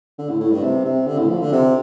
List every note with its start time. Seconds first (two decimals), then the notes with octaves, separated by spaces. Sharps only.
0.18 D3
0.29 A2
0.40 A2
0.52 G2
0.63 C3
0.85 C3
1.07 D3
1.18 A2
1.29 F3
1.41 D3
1.52 C3